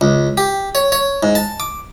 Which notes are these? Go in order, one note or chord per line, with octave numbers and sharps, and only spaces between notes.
C#2
G4
C#5
C#5
G#2
A5
D6